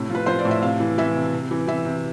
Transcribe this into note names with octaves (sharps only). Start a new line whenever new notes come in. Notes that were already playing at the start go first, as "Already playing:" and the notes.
Already playing: A2 C3
F3 B4
F3 C5
D5
A2
E5
C3 F5
E3
E3 E5
C3
C3
E3
E3 E5
C3